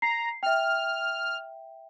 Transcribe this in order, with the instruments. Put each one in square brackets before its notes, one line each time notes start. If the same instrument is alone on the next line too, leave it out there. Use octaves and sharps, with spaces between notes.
[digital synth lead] A#5 [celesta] C7
[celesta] E5 G5 [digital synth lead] F6